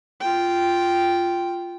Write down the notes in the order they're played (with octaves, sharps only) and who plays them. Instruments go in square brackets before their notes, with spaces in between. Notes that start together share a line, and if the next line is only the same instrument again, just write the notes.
[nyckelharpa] F4 G5